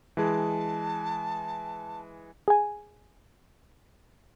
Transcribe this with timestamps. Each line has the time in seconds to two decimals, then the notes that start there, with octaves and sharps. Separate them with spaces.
0.17 E3 G#3 G#4 A5
2.48 G#4 G#5